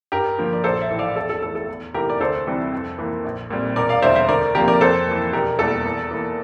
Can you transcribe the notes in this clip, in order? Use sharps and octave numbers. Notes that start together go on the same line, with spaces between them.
G2 G4 A#4
D3 F3 A#3
D5
A#1 A4 C5
C5 E5
A2 E3
D5 F5
E2 A4
A4
E3 A3 A4
A4
E2
C3 E3 A3 C4 G4 A#4
D5
D2 A4 C5
C3 E3 G3 C4
F2
E3 A#3
A#1
A#2 G3 C4
E1 A#4 D5
D5 F5
E2 D3 G3 C5 E5
C5 E5
D2 A#4 D5
C3 F3 A#3 G4 A#4
A#4 D5
F2 A4 C5
E3 A#3
E1 G4 A#4
E2 E3 G3 A#3 A4
E2
E3 A#3